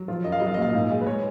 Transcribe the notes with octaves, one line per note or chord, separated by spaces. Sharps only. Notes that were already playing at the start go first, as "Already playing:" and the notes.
Already playing: F#3
F3 F4
F#2 D#5
F5
F#3 D#5
F5
D#5
A#2 F5
G#2 D#5
G#3
B4
G#3 C#5